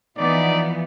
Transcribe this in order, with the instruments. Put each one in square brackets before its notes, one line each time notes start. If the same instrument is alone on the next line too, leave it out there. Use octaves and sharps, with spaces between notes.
[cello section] E3 F3 B3 [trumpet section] D#4 D5